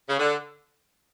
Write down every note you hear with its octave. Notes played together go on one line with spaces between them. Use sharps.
C#3
D3